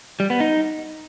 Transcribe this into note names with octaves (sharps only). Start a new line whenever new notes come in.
G3
B3
D#4